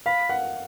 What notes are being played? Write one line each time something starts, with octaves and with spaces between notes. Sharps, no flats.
F5 B5
F#5